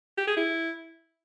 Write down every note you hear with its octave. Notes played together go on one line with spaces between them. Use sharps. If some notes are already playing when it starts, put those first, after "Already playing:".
G4
G#4
E4